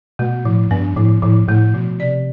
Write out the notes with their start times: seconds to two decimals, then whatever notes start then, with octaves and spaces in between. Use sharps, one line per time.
0.19 B2 A3
0.45 A2 F3
0.71 G2 B3
0.96 A2 F3
1.22 A2 F3
1.48 A2 A3
1.74 B2 F3
2.00 C3 D5